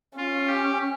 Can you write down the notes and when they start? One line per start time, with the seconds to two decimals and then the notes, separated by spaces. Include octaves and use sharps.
0.17 C#4 F4
0.47 G4